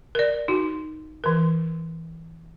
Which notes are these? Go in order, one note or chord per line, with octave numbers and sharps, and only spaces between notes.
A#4 D5
D#4 F#4
E3 A#4